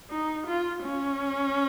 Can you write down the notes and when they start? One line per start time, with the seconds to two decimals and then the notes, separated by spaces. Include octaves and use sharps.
0.11 D#4
0.47 F4
0.84 C#4